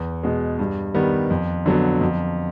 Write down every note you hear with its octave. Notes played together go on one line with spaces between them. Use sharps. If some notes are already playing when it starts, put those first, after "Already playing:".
Already playing: E2
B2 G#3
G2
D#3 G3 B3
F2
D3 F#3 B3
F2